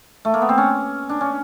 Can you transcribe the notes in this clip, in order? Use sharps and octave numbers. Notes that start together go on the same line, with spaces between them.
A3
A#3
B3
C4
C#4
D4
C#4